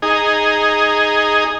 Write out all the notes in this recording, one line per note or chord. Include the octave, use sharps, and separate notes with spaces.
D#4 G#4